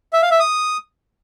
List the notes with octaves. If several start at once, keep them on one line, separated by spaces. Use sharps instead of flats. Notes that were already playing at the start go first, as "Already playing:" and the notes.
E5
F5
E5
D#6